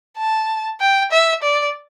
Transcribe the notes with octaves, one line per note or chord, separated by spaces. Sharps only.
A5
G5
E5
D5